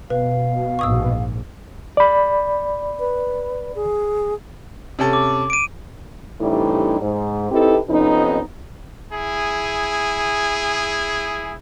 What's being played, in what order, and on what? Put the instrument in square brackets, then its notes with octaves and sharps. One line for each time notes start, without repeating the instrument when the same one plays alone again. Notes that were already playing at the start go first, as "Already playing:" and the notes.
[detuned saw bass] B2 [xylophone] B4 [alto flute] F5
[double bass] A#1 G#2 [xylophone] C#6 D#6 E6
[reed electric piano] D5 B5
[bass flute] B4
G#4
[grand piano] C3 C#4 A4
[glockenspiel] D6
D7 D#7
[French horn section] A2 C3 E3 G3 D4 D#4
G#2
C4 D#4 E4 G4 A4 B4
F2 C3 B3 C#4 D#4
[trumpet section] E4 G#4